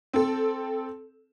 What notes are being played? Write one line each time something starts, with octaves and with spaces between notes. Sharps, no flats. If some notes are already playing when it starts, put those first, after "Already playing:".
C4 A4